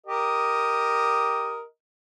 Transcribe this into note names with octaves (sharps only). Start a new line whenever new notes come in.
G4 A#4 D#5